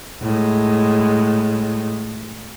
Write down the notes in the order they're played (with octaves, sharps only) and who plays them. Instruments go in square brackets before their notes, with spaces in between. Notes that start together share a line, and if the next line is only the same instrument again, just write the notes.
[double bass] A2 G#3